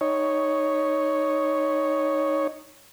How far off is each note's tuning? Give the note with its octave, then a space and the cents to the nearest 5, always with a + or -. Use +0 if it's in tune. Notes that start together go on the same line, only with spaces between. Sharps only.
D#4 +0 C#5 +0